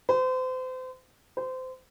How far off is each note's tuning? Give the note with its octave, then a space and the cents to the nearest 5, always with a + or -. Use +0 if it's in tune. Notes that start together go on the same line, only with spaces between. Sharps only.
C5 -35
C5 -25